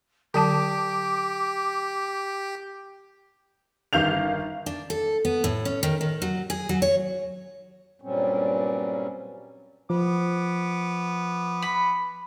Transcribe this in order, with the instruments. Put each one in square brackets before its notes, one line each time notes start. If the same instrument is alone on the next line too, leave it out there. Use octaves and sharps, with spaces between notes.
[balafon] D3 F#3 A5 [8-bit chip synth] G4 [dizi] D6
[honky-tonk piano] G1 D#3 F5 G6 F7
[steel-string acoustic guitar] D4
A4
B3
A2
C#4
D#3
D#3
F#3
G#4
F#3
C#5
[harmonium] G2 A#2 F#3 G3 C4 C#4
[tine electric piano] F3 [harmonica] B3 D6
[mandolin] B5